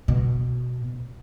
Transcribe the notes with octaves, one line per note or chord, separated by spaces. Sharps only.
B2